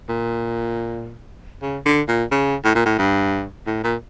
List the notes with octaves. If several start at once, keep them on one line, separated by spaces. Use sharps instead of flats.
A#2
C#3
D3
A#2
C#3
A2
A#2
A2
G2
A2
A#2